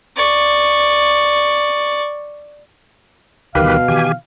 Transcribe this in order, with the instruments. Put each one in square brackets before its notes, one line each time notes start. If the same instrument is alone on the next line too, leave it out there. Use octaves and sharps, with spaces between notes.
[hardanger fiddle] D5 C#6
[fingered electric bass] D2 E3 G3 [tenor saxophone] B2 [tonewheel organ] D#3 G4 B4 [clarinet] F5
[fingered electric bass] D#3 E3 [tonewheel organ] G4 G#5